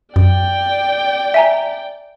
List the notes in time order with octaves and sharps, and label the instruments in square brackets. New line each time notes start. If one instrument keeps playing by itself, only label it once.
[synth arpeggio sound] F#2 [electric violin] D5 G5
[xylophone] E5 G#5 A#5